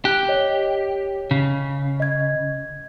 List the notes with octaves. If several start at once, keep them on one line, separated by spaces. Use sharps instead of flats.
G4 F#6
C#5 D#5
C#3
D#5 G#6